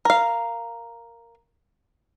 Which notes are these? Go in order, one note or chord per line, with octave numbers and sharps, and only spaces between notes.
A#4 F5